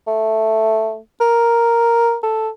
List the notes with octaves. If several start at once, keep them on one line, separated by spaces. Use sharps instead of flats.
A3
A#4
A4